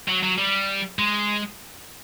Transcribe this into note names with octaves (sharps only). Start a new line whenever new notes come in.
F#3
F#3
G3
G#3